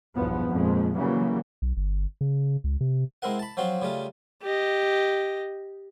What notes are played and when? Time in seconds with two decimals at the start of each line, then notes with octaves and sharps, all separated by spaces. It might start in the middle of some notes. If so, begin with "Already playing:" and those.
0.16 B1 E2 G2 F3 B3
0.49 A#1 F2 F3 G#3
0.97 C#3 E3 F#3 G3 A#3
1.62 B1
1.77 G1
2.21 C#3
2.64 C#2
2.81 C3
3.22 G#3 C4 E4 A#4 F#5
3.39 A5 B5
3.57 F3 F#3 C4 F4 F#4
3.82 C#3 G3 A3 F4
4.43 G4 D#5